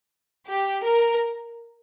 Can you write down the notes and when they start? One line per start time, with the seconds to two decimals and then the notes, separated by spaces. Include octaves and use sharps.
0.47 G4
0.83 A#4